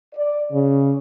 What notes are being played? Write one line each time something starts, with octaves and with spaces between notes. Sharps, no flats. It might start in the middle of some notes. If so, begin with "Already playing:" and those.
D5
C#3